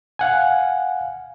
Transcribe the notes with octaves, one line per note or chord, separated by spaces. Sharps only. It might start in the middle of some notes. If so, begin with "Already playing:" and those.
F5 F#5 G#5